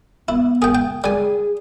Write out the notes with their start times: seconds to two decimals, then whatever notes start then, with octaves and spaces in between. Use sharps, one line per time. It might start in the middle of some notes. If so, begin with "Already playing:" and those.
0.28 B3 E4
0.62 G#4 G5
0.75 G5
1.04 G3 G#4 G#5